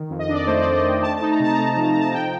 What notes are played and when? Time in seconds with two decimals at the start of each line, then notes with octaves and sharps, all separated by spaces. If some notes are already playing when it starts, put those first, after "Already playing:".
Already playing: D#3
0.10 F2
0.19 D#5
0.28 D4
0.33 D5
0.47 A3 C5
0.55 D#5
0.61 F2 D5
0.75 D#5
0.84 D#3 G5
1.03 A3 A5
1.16 A5
1.21 D#4
1.31 A#5
1.40 C3 A5
1.54 A3 A#5
1.64 A5
1.73 F3 A#5
1.82 A5
1.92 F3 A#5
2.01 A5
2.14 F3 G5